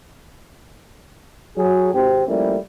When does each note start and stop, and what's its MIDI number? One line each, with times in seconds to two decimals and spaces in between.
1.57 1.91 54
1.57 1.91 68
1.93 2.23 32
1.93 2.23 60
1.93 2.23 67
2.27 2.56 53
2.27 2.56 55
2.27 2.56 57
2.27 2.56 58
2.27 2.56 61
2.27 2.56 64